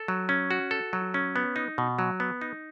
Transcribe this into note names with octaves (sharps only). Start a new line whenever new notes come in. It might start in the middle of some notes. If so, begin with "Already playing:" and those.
Already playing: A4
F#3
C#4
F#4
A4
F#3
C#4
B3
D#4
B2
F#3
B3
D#4